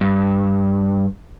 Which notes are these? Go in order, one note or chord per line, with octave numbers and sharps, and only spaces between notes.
G2